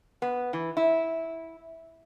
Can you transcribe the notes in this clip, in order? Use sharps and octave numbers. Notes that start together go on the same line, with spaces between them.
B3
E3
E4